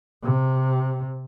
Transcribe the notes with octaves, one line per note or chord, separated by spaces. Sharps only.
C3